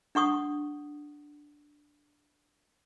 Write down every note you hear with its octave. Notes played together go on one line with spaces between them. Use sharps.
D4 F#5 C#6 D#6